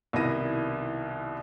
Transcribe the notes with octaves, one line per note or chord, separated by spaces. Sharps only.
C2 B2 D#3 E4 A#6 D#7